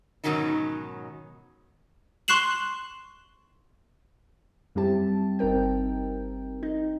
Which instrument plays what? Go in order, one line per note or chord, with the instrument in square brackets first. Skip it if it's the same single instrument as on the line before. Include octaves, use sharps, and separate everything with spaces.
[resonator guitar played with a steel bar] G#2 B2 D#3 F#3 C#4 D#4
[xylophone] C6 C#6 F#6 C7 E7 F#7
[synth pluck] F#2 G3 C4 E4 G4 A5
G1 C4 D#4 A#4 G5
D#4